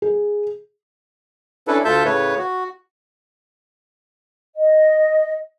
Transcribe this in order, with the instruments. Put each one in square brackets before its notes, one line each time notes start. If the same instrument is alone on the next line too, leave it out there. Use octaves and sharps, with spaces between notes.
[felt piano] G#4
[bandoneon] C#4 D4 E4 A4 B4
D2 F4 A4 E5 A5 G6
A2 C#3 B4 C#5
F#4
[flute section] D#5